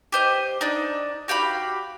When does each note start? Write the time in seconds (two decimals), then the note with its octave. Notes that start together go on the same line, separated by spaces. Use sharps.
0.12 G4 C5 D#5
0.61 D4 D#4
1.28 F#4 G4 F5 B5